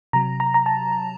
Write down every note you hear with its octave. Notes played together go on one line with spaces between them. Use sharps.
C3 F#3 A#5
A#5
A#5
A5